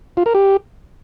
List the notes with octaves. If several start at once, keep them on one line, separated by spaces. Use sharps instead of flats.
F4
A#4
G4